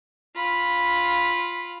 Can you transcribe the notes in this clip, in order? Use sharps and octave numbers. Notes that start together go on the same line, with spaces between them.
F4 B5